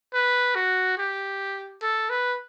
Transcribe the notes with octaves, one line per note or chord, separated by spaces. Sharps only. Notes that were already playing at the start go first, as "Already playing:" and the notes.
B4
F#4
G4
A4
B4